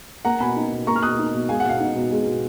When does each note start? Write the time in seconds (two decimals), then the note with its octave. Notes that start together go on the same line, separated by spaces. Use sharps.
0.25 A#3 F#5 A#5
0.40 B2 G#5 B5
0.56 D#4
0.71 B2
0.87 A#3 A#5 C#6
0.96 F6
1.02 B2 D#6 F#6
1.19 D#4
1.34 B2
1.49 G#3 F5 G#5
1.60 F#5
1.64 B2 F5
1.80 D#4
1.96 B2
2.11 G#3
2.26 B2